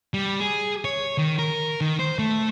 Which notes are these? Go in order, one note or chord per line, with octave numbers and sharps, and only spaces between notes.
G3
G#4
C#5
D#3
A#4
D#3
C5
A3